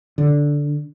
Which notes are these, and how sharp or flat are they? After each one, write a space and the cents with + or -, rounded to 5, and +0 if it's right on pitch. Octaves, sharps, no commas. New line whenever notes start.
D3 -5